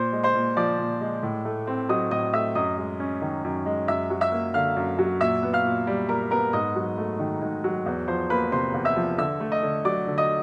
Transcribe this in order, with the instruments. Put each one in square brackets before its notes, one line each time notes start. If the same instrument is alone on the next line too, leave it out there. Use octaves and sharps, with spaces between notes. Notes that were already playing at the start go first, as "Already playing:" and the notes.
Already playing: [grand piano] A#2 C5 C6
G#3
C5 C6
A#2
F3 D5 D6
A#2
G#3
A2
A3
C4
F#3 D#5 D#6
A2 D#5 D#6
A3 E5 E6
F#2 D#5 D#6
G#3
C#4
D#3
F#2
G#3
F#2 E5 E6
F#3
E5 E6
A#3
D3 F5 F6
F#2
F#3
A#2 E5 E6
B3
F5 F6
A#2
G3
A#2 A#4 A#5
B3 A#4 A#5
G#2 D#5 D#6
F#3
A3
D#3
G#2
F#3
E2
F3 C5 C6
A#3 B4 B5
C3 C5 C6
E2
E5 E6
F3
D3 E5 E6
A3
D#5 D#6
D3
F#3 D5 D6
D3
D#5 D#6